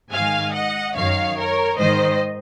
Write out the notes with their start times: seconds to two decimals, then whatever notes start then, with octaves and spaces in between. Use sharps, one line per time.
0.12 G#2 D#3 F5 G#5
0.54 D#5 F#5
0.95 F#2 D#3 C#5 F5
1.37 A#4 C#5
1.78 G#2 D#3 C5 D#5